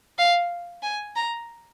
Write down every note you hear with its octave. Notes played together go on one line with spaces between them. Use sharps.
F5
G#5
A#5